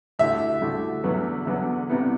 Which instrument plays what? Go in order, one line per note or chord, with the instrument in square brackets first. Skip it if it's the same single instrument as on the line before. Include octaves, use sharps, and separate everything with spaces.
[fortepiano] D2 D3 A3 E4 G4 [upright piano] E5
[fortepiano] D2 D3 A3 E4 G4
E2 D3 F#3 B3 F#4
E2 D3 F#3 B3 F#4
C2 C3 G3 B3 E4